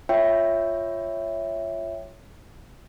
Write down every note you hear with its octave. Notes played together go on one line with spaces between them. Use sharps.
F4 C#5 E5 G5